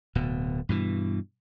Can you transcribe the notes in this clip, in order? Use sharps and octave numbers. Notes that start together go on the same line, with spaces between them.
D1 B2
G2 B2 E3